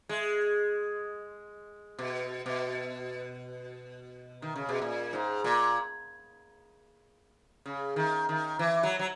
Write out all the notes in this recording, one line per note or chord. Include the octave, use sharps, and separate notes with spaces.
G#3
B2
B2
D#3
C#3
B2
A#2
G#2
A#2
C#3
D#3
D#3
E3
F#3
F#3